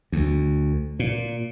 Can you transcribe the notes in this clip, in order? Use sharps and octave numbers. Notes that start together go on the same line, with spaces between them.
D2
A#2